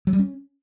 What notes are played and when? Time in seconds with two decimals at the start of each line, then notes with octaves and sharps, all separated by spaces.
0.07 F#3
0.13 G3
0.19 C#4